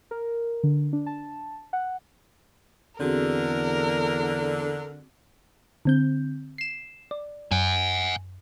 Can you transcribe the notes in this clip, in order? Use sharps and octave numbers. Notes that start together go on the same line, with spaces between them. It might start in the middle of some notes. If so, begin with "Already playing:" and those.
A#4
D3
D4
A5
F#5
E2 D3 C4 F#4 G#4 A#4
D3 C4 G6
C7 E7
D5
F#2 F#5 G#5